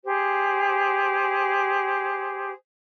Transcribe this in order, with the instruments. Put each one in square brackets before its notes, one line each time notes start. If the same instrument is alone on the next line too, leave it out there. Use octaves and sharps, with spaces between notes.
[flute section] G4 G#4 C5